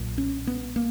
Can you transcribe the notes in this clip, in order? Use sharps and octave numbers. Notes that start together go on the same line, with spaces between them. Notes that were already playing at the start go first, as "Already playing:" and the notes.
Already playing: B1 A#2
C#4
B3
A#3